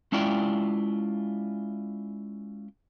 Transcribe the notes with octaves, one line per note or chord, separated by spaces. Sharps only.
G#3 C#4 E4 F4 D5 G5